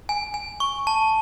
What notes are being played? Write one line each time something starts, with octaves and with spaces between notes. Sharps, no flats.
G#5
G#5
C#6
A5